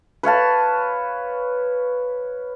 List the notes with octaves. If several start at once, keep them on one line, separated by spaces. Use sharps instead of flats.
B4 C#5 F5 A5